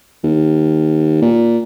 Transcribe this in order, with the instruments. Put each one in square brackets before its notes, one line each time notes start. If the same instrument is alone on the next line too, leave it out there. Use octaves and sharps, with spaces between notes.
[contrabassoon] D#2
A#2